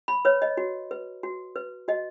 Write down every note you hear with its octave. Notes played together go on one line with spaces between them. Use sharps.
B5
B4 C#5
D#5
F#4
B4
F#4
B4
F#4 D#5